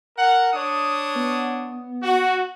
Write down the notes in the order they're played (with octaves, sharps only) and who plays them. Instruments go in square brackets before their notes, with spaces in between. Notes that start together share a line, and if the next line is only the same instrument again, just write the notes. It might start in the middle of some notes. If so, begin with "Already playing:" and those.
[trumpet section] A#4 F#5
D4 C#5 D#6
[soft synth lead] B3
[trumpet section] F#4